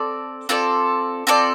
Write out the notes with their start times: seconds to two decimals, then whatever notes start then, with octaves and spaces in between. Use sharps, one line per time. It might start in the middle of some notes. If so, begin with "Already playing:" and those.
Already playing: C4 A4 D5
0.49 C4 F4 A4 D5
1.27 C4 F4 A4 D5